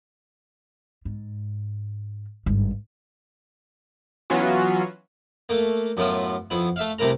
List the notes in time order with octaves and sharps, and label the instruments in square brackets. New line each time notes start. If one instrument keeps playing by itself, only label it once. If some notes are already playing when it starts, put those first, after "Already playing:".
[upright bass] G#2
G#1 G2
[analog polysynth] E3 F#3 B3 C#4 F4 F#4
[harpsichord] A3 A#3
F#2 A2 B3 F4 E5
F2 B3 E4
A3 E5 F5
C2 C3 A3 E4 A#4 A#5